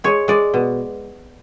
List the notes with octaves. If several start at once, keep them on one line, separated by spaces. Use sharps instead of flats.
G#3 C#5
G#3 D5
B2